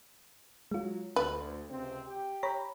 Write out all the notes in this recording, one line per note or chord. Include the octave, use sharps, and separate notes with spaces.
F#3 G#3 F4
D2 B4
C#2 C3 C4
G4 G5
C#5 A#5 B5